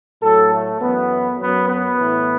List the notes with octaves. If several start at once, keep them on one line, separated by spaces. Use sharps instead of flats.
A2 F#3 A4
A3
F#2 E3 B3
F#2 F#3 B3
B3
A2 E3